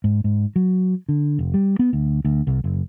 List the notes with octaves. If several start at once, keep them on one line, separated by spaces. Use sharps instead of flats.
G#2
G#2
F#3
D3
F1
G3
B3
D2
D2
C2
F#1